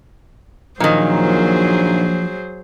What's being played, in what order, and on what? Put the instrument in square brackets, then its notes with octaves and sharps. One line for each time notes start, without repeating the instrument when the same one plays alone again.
[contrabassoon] A#1 [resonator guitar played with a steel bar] A#2 D#3 [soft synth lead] F3 [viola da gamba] F#3 G#4 C5